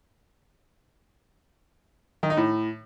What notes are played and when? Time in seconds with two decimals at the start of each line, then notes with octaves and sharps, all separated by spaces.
2.23 D#3
2.30 D#4
2.37 A2